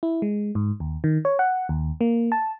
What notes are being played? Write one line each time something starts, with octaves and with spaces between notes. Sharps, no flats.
E4
G#3
G#2
D#2
D#3
C#5
F#5
D#2
A#3
A5